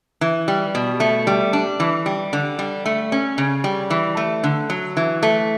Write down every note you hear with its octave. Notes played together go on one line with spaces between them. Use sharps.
E3
G3
B2
A3
G3
D4
E3
G3
D3
G3
A3
C#4
C#3
G3
E3
A3
D3
F#3
E3
A3